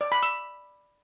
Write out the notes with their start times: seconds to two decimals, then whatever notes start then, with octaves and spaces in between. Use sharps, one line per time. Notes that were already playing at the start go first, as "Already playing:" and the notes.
0.01 D5
0.12 B5
0.23 E6